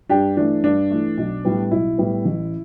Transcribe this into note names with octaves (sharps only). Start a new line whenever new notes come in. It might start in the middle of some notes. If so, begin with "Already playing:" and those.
G2 D4 G4
E3 A3 D4
G2 D4
E3 A3
B1
A2 G3 B3
B1 E4
A2 G3 B3
A1